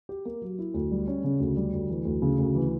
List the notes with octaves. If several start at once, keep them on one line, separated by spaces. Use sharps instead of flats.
G4
A#3
F#3
E4
D2
G3
C#4
C#3
D2
G3
D2
E3
D2
C#3
D2
E3